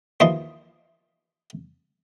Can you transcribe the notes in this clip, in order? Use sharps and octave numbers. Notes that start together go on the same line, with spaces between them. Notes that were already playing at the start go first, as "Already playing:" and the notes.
D#2 E3 F3 F4 D#5 C6